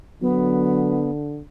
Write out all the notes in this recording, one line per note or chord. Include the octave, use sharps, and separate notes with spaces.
D3 F#3 B3